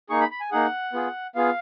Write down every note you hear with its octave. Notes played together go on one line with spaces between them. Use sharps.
A#3 D#4 G#4 C#6
B5
B5
G#5
A#3 D#4 G#4 F#5
B3 F4 G#4
B3 F4 G#4 F5